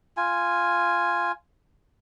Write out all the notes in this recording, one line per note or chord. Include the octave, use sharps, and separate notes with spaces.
F4 G#5